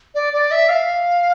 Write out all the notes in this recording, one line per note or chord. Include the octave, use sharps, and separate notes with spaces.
D5
D5
E5
F5